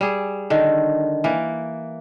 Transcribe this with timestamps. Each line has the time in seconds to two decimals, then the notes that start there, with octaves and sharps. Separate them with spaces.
0.01 G3 G#4
0.50 D3 D#3
1.24 E3 A#3